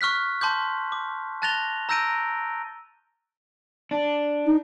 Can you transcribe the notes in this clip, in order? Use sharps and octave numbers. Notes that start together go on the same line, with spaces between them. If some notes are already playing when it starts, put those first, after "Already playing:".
C#6 F6 F#6 B6
A5 C6 D6 G6
D6
A5 F#6 A6 A#6 F7 G7
A#5 E6 G6 A#6 D7 D#7
D4
D#4